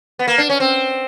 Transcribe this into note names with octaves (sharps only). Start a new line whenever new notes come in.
B3
A#3
D4
C#4
C4